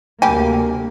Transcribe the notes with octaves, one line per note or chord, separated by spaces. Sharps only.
D2 C3 G3 A#3 G4 G#5